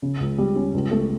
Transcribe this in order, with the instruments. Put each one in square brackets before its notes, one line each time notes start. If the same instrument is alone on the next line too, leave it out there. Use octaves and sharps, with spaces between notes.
[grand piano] C#3
C#2
G3
C#4
C#2
A3